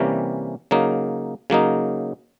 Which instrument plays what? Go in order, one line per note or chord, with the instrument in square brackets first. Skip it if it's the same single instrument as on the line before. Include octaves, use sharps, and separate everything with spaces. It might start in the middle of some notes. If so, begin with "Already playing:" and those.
Already playing: [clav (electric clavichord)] C3 E3 G3 A#3 C#4
C#3 F#3 A#3 D#4
C#3 F#3 A#3 D#4